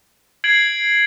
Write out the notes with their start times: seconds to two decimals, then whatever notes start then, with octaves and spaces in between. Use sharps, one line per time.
0.44 G#6 C7 D7 F#7